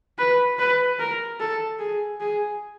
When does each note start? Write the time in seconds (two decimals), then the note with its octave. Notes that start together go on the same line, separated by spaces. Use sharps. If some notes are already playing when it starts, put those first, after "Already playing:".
0.18 B4
0.59 B4
0.99 A#4
1.40 A4
1.79 G#4
2.20 G#4